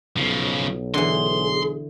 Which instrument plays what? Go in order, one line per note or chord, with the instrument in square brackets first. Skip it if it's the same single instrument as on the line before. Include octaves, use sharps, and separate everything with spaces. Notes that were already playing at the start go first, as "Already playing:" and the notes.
[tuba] B1 [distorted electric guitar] C#3 F3
[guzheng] D3 E3 [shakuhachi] G#4 [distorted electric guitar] C6